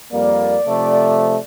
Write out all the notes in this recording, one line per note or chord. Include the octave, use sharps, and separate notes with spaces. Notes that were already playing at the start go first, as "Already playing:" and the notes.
F2 G3 A#3 D5
C3 F3 A3